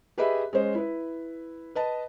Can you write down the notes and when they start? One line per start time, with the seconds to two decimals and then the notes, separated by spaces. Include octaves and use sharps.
0.18 G4 G#4 B4 D#5 E5 B5
0.53 G#3 C#4 C5 D#5
0.75 E4 B4
1.75 B4 D#5 A5